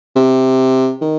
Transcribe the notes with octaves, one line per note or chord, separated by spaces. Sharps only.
C3
D#3